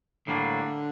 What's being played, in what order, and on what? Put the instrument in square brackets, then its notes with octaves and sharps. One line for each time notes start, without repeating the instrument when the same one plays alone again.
[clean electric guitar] A2 G3 A#3 D4 [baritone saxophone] D3